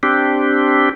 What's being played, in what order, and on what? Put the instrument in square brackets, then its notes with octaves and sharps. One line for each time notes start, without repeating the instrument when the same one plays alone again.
[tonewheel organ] C4 D4 G4